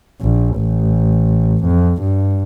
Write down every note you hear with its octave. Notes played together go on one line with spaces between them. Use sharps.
A#1
A1
F2
G2